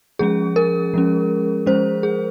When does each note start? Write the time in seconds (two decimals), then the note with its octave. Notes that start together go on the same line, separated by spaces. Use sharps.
0.19 F3 G#3 C#4 G#4
0.56 A#4
0.94 F3 G#3 C#4
1.66 F3 G#3 C#4 C5
2.03 G#4